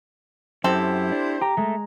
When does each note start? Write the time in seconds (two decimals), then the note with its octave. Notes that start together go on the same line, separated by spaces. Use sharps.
0.64 F#2 C4 E4 G4 A4 C5
1.12 D4
1.41 G4 A#5
1.57 G#3 A3